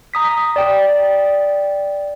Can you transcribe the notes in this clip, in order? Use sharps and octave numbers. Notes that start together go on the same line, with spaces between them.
A#5 D#6 B6
D5 G5